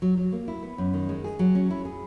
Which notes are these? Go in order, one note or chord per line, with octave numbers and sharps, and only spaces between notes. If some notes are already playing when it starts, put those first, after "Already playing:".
F#3
F#3
A#3
E4
B3
F#2
D#3
G#3
G#4
F#3
C#4
E4
G#4